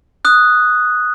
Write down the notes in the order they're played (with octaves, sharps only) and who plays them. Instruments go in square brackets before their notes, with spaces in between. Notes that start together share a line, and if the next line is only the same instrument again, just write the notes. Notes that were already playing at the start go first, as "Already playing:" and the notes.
[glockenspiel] D#6 F#6